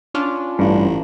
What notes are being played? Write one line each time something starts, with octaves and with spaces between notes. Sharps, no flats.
C#4 D4 F4
A1 G2